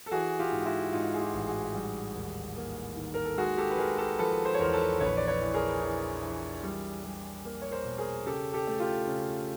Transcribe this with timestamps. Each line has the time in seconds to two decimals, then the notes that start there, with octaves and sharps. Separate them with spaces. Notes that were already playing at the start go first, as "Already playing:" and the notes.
0.06 A4
0.11 E3 F#4 G#4
0.39 F4 G4
0.52 G#2
0.66 E4 F#4
0.92 G#2 D#4 F4
1.14 G#4
1.20 F4 G4
1.33 A1
1.47 F#4 G#4
1.74 G3
2.15 D#2
2.56 A#3
2.96 D#3
3.14 A#4
3.25 A4
3.37 G#3 F#4 G#4
3.57 G4 A4
3.70 B4
3.78 G#3 G#4 A#4
3.98 G4 A4
4.19 F3 A4 B4
4.45 C5
4.54 C#5
4.59 E2 A#4 C5
4.73 A4 B4
5.00 A#1 B4 C#5
5.17 D5
5.28 B4 C#5
5.41 E3
5.54 G#4 A#4
5.81 E3
6.22 E3
6.63 G3
7.04 G3
7.45 A#3
7.62 C#5
7.71 A#4 C5
7.85 B2
7.98 G#4 A#4
8.26 C#3 G4 A4
8.53 G4 A4
8.67 A3
8.80 F4 G4
9.07 C#3